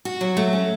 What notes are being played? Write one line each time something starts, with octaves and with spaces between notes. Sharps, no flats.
F#4
F#3
A3
C#4